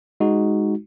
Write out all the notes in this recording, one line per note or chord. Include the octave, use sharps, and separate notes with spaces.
G#3 D#4 F#4